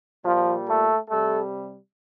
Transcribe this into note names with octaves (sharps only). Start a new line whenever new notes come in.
A#2 F3 G3 F4
A3 A4
C3 G3 A3 A4